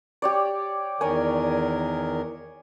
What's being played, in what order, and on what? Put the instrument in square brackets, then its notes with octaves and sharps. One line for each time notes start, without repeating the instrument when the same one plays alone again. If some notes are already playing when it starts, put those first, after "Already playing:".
[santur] G4 C#5 D5
[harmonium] E2 D#3 A#4 [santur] C#5 D5 G#5